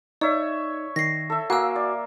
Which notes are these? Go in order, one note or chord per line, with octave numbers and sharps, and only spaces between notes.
D#4 C#5 D5 E5
D#3 A#6 C7
A4 E5
A#3 F#4 F5 G#5 E6
D5